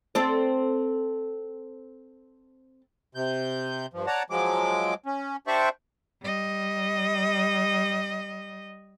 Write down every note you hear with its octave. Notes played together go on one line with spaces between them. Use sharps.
C4 A4 D5
C3 G6
G2 F3
C#5 D5 F#5 A5 A#5
F3 F#3 G#3 D6
C#4
D4 G4 C5 D5 E5 C#6
G3 D#5